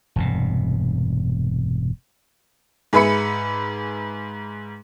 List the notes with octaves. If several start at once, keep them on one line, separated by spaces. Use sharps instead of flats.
E1 G2 C3
G#2 G#4 B4 E5 B5 C#7